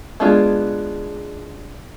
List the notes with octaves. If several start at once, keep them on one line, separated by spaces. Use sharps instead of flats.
G#3 B3 D4 F4 G#4